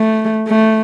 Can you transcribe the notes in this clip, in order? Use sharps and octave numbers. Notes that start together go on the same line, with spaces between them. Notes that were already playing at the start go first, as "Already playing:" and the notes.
Already playing: A3
A3